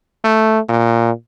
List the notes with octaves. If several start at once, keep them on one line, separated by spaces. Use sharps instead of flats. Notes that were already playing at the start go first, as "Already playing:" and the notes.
A3
A#2